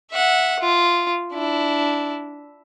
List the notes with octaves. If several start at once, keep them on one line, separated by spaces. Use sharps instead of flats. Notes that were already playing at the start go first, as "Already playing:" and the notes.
E5 F#5
F4
D4 E4